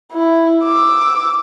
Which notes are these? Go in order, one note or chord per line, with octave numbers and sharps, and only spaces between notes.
E4
D6 E6